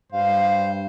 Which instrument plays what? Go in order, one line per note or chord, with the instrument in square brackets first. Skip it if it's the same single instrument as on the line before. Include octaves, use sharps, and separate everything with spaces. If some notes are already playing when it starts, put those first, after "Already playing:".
[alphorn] G2 [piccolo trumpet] C5 [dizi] F5